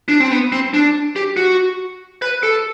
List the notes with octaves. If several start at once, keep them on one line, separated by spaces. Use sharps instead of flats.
D4
C4
B3
C4
D4
G4
F#4
B4
A4